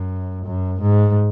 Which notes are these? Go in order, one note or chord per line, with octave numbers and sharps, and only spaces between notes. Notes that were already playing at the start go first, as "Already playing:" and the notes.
Already playing: F#2
F#2
G#2